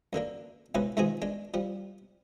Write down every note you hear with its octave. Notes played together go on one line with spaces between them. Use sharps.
F#2 D3 A#3 D4
C#2 G#2 B2 C#4 B4
G#2 B2 D#3 F3 G#3 G#4
G#3 D4
F3 G3